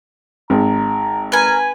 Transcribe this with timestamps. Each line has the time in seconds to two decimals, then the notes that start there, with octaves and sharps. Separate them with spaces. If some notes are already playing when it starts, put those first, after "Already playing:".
0.50 G#1 A#5
1.32 A#4 B4 G#5